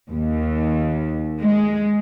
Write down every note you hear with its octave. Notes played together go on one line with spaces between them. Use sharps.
D#2
G#3